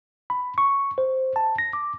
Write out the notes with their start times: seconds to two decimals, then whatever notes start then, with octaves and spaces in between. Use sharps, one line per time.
0.30 B5
0.58 C#6
0.98 C5
1.36 A5
1.58 A#6
1.73 D6